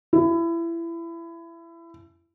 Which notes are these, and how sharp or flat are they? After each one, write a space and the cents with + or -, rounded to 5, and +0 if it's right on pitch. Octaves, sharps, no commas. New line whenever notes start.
E4 +25